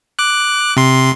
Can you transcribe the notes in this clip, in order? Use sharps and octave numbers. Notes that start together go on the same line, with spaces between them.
D6 F#6
C3 C6